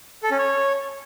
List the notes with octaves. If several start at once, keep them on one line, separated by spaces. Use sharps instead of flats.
A4
C#4
C#5